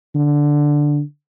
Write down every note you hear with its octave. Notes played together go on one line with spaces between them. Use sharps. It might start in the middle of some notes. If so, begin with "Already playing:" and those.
D3